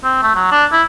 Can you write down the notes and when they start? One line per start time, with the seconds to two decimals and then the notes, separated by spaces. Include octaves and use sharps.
0.04 C4
0.23 A3
0.35 F#3
0.52 D4
0.72 E4